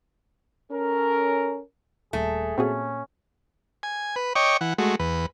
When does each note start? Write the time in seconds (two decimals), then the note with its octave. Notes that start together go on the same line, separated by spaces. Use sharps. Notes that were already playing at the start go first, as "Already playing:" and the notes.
0.71 C#4 A4 A#4
2.13 D#1 A3 G#4
2.58 A#2 C4 C#4 F#4 G#4
3.83 G#5
4.16 B4
4.36 C#5 D#5 G5 C#6 D6
4.61 E3 F#5
4.78 G#3 A3 F#4
5.00 E2 B4